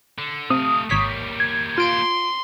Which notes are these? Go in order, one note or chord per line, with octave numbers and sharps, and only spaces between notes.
D3
C3 A3 F5 D#6
G#1 G3 A#3 C#5 B6
G#6
F4 C6 D7